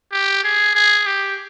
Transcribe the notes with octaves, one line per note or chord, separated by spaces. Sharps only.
G4
G#4
G#4
G4